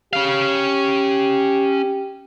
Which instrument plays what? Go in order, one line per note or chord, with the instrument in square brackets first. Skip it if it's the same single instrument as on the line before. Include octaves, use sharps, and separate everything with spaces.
[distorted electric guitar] C#4 F5 [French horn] G4